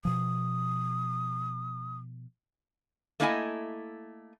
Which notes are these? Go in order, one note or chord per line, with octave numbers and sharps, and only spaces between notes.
B2 F3 D#6
A3 A#3 D4 E4 D#5 G#5